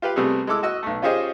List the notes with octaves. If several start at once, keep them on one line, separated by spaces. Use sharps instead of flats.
F4 G4 B4 F5
C3 G3 A3 B3 G#4
G#3 E4 A4 D6 E6
F#4 D#5 E6
B1 A3
C#4 F4 G4 G#4 C5 D#5